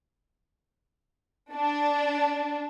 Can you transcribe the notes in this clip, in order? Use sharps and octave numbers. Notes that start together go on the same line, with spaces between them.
D4